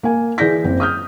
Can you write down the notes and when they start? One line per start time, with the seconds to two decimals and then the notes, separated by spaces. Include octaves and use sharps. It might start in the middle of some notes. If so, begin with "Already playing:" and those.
0.03 A#3 G#5
0.38 E3 G#4 D5 G6 A#6 B6
0.64 F#1 C4
0.80 D#6 F6 G6